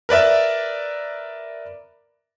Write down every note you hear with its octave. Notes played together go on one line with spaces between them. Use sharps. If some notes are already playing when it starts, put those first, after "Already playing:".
A#4 B4 D5 E5